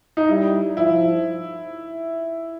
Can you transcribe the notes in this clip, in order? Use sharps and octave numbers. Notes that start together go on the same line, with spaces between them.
D#4
G3 E4
F3 E4